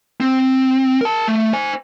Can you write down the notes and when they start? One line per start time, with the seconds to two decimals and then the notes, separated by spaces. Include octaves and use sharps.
0.20 C4
1.01 A#4 A5
1.28 A3
1.53 C5 G#5